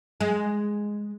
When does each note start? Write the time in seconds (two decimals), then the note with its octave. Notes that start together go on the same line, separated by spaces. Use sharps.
0.21 G#3